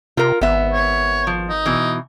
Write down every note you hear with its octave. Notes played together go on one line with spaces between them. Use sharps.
C3 F4 A#4
G#1 B3 E5
C#5
F3
D#4
B2 E3